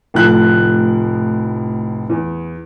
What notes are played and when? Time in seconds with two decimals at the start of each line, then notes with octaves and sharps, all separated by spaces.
0.14 F1 A2 F3 F#6
2.09 E2